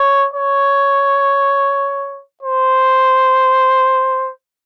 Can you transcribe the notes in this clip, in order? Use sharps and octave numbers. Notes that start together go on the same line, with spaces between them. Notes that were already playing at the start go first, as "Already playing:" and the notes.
Already playing: C#5
C#5
C5